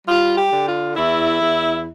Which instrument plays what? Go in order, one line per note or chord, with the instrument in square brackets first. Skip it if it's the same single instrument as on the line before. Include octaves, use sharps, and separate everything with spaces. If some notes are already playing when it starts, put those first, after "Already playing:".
[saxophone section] G3 F4
G4
D3
F4
E2 E4
E2